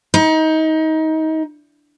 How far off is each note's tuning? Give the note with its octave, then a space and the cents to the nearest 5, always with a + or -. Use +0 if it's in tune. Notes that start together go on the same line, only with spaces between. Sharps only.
D#4 +25